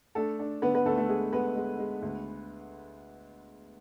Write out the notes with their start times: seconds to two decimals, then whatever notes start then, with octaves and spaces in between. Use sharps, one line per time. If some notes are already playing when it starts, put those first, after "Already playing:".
0.15 A3 D4 A4
0.39 D4
0.62 D3 B3 B4
0.74 B3 B4
0.85 D2 A3 A4
0.97 A3 A4
1.09 G#3 G#4
1.33 G#3 B3 B4
1.56 G#3
1.79 G#3
2.02 D2